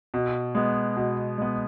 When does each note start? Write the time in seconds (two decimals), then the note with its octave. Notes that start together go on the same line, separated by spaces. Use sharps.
0.14 B2
0.55 G#3 B3
0.97 B2
1.38 G#3 B3